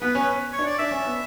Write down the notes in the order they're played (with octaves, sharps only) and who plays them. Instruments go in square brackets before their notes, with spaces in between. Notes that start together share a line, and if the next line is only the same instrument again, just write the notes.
[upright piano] B3 [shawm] B4
[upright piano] C#4
[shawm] C#5
[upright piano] D4
[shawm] D5
[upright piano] D4 [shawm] E5
[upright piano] C#4
B3